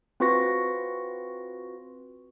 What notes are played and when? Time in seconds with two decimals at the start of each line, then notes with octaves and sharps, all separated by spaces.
0.20 C4 F4 F#4 B4 C#6 A#6